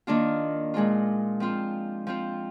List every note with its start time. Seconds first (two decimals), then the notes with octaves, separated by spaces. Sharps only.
0.07 D#3 A#3 D4 F4
0.74 A#2 G#3 D4 F4
1.40 F3 C4 F4
2.07 F3 C4 F4